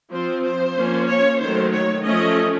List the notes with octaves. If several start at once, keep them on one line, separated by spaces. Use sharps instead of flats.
F3 C4 C5
C5
F3 A#3 C#4
C#5
D#3 F#3 A3 C5
C#5
F3 A3 C#4 D#5